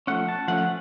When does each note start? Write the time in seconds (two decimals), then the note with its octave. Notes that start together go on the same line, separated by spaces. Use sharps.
0.07 F3 A3 C#4 F#5
0.29 A5
0.48 F3 A3 C#4 F#5